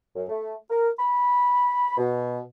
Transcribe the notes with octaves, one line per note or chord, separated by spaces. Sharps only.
F#2
A3
A#4
B5
B2